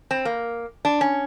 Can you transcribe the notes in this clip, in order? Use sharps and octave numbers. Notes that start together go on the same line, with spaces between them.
C4
A#3
D4
C#4